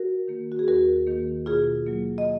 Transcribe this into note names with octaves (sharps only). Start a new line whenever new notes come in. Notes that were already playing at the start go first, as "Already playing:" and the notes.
Already playing: F#4 A#4
D#3 A#3
F#4
G#4
D#2 F#4 A#4
D#3 A#3
B2 F4 G#4
F#3 A#3
D#5